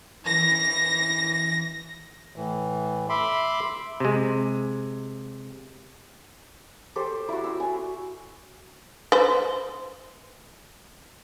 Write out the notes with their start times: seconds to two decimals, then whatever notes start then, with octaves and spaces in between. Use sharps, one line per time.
0.24 E3 A#6
2.36 A2 E3
3.09 E5 B5 C6 D6
4.00 C3 G#3
6.96 G4 A4 C5
7.28 E4 F#4
7.44 E6
7.60 G#5
9.12 B4 C5